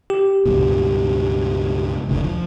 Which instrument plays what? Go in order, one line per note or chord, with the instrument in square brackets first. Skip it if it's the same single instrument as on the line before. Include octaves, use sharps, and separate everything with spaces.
[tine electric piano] G4
[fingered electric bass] C#2 G2 B2
F1 D2 D3
F3